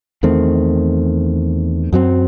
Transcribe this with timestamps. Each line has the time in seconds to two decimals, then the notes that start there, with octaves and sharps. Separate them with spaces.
0.23 E2 D#3 A3 C4
1.93 F#2 F#3 C4